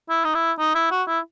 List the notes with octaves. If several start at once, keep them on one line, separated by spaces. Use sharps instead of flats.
E4
D#4
E4
D#4
E4
F#4
E4